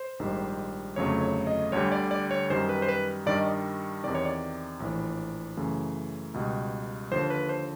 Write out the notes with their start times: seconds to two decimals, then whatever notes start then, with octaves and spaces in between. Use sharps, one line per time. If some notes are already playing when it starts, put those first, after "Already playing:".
Already playing: C5
0.19 A#1 G#2 D#3 G3
0.96 G1 F2 C#3 F#3 A3 C#5
1.21 C#5
1.47 D#5
1.72 D2 D3 G3 C#5
1.92 D5
2.11 D5
2.31 C#5
2.50 F#2 D#3 G3 C5
2.69 B4
2.82 C5
2.89 B4
3.26 G2 D#3 G3 D5
3.37 D#5
3.46 D5
4.04 E2 C3 D#3 D5
4.15 C#5
4.25 D5
4.80 A#1 A2 E3
5.57 F#2 C#3 E3 A3
6.34 C#2 B2 G3
7.11 D#2 D3 F3 C5
7.30 B4
7.49 C5